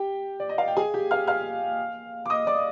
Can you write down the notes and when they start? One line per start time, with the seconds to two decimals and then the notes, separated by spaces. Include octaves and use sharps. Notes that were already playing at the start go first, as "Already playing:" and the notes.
Already playing: G4 G5
0.40 D5
0.49 D#5
0.58 F5
0.68 G5
0.77 G#4 G#5
0.94 G4 G5
1.11 F5 F6
1.28 F5 F6
2.26 D6
2.30 D#5 D#6
2.47 D5 D6